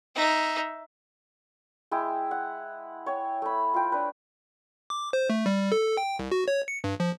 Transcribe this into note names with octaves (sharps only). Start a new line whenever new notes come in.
D#4 E5
G#3 E4 G5
F#5
C#5 G5
A3 B5
F4 G5
D4 B4
D6
C5
A3
G3
A4
G5
C2
F#4
C#5
C#7
G2
F3